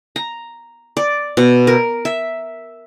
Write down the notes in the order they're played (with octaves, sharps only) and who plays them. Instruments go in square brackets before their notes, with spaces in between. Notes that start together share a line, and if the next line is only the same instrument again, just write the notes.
[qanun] A#5
D5
B2
A#4
E5